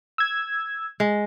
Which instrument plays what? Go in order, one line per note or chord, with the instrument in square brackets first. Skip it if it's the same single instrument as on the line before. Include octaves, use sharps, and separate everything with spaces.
[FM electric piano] E6 G#6
[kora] G#3